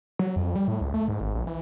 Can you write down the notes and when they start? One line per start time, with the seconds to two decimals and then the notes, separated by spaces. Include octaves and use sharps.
0.19 F#3
0.36 F2
0.56 G3
0.68 A2
0.81 C#2
0.94 A3
1.08 G#2
1.21 G#1
1.35 A#1
1.47 E3